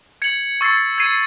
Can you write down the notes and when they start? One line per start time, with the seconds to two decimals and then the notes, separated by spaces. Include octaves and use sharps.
0.22 G#6 C#7 F#7
0.61 C#6 E6 A6 C7
0.98 G#6 C7 D#7